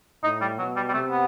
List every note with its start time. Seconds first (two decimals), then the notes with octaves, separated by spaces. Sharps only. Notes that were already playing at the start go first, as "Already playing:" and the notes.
0.24 A2 D#4
0.41 G3
0.59 B2 F#3
0.76 G3
0.89 G3
0.94 C3 A3
1.11 B3